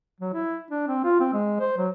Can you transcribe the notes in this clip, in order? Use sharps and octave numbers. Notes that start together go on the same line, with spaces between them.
F#3
E4
D4
C4
F4
C4
G#3
C5
F#3